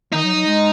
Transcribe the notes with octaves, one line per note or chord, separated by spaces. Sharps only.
D#3 D#4
F#3
F#3
G#3